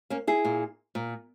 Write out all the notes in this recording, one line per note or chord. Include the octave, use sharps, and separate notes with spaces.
A#3 C#4
E4 G#4
A#2
A#2